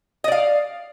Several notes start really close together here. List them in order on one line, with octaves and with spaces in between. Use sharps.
D#5 D5 F5